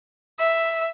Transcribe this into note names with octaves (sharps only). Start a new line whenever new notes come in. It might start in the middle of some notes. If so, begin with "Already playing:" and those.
E5